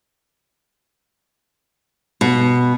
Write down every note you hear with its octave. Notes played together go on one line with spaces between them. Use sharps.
B2